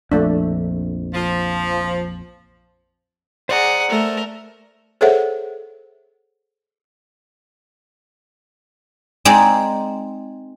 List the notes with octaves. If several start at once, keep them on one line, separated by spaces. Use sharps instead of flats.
A#1 F2 A3 D4
F3
G#4 C5 D5 F#5 A#5
A3 A#4
G#4 A4 C5 C#5 E5 F#5
G#3 C4 D#4 G#4 D5